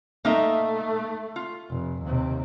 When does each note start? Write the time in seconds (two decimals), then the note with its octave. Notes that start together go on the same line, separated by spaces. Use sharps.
0.25 A3 A#3 D#4 E5
1.36 F4
1.70 F1
2.03 D#2 C3